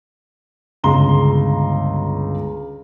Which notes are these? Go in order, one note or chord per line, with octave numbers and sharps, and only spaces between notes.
G1 C#2 A#5 C6 G7